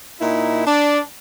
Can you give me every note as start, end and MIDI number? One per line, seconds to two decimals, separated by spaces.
0.20 0.63 46
0.20 0.63 63
0.20 0.63 64
0.65 0.99 62